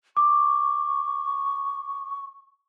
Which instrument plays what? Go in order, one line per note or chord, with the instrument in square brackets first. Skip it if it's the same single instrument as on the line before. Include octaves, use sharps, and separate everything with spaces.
[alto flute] C#6 [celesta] D6